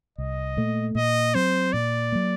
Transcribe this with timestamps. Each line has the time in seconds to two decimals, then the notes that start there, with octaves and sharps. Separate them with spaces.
0.18 C2 D#5
0.57 A#2 A3
0.95 A#2 D#5
1.34 F#3 C4 C5
1.73 A#2 D5
2.12 F#3 A#3